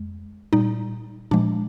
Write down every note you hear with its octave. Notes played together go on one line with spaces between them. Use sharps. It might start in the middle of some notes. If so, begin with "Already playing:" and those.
Already playing: F2 G#3
A#2 G3 D#4
A#2 F3 G#3 D4